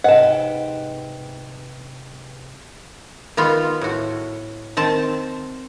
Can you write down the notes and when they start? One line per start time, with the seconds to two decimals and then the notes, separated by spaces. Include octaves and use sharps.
0.04 G#2 C3 B4 D#5 F#5 G5 A5
3.37 D#3 B3 F4
3.81 A2 F#4
4.77 D#3 C4 A5